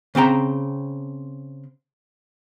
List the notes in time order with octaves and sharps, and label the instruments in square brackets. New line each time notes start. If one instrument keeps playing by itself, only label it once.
[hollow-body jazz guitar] C#3 C4 G5 A#5